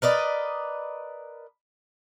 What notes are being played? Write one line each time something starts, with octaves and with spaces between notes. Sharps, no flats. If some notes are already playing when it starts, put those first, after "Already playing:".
A#4 B4 D5 D#5